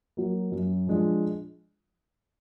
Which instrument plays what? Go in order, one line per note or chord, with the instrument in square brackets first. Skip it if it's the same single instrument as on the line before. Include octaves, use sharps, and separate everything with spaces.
[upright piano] F#3 A#3
F#2
F3 G#3 D4 F4